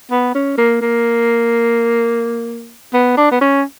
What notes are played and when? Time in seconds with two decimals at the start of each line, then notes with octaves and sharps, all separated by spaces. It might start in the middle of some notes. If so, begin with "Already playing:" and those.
0.11 B3
0.35 C#4
0.58 A#3
0.81 A#3
2.93 B3
3.17 D4
3.31 B3
3.41 C#4